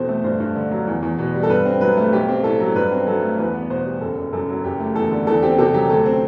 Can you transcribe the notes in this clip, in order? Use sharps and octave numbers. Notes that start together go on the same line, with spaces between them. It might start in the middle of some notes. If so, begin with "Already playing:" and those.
Already playing: E2 B2 C4 A4 C5
A3
G2 C5
G2
D3
F#3
E2
E2
B2
G3
A4
G2 B4
C4
F#3 B4
A3
B1 G4
C4
A2 A4
F#3
G2 B4
C4
F#3 A4
A3
E2 B4
B3
B2 C5
G3
F#1 A4
F#1
F#2 A4
F#3
F#1 G4
A3
E2 A4
D3
E2 A4
C4 G4
C3 A4
F#3 G4
D2 A4
C4